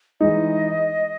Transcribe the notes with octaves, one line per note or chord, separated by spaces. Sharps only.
E3 G#3 D#4 D#5